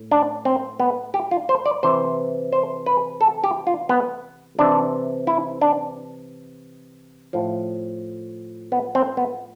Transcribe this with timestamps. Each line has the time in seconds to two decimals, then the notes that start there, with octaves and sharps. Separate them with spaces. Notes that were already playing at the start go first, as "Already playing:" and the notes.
Already playing: A2
0.11 D4
0.45 C4
0.80 B3
1.14 G4
1.31 F4
1.49 C5
1.66 D5
1.83 C3 E3 C5
2.53 C5
2.86 B4
3.21 A4
3.44 G4
3.67 F4
3.89 B3
4.59 C3 E3 D4
5.27 E4
5.61 D4
7.33 A2 F3
8.72 B3
8.95 C4
9.17 B3